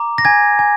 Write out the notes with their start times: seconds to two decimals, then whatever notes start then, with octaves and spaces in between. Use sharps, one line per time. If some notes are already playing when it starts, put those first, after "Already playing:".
Already playing: A#5 D6
0.18 A#6
0.25 G#5 G#6
0.59 G#5